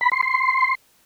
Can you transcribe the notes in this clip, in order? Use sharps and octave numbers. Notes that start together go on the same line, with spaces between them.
B5
C6
C6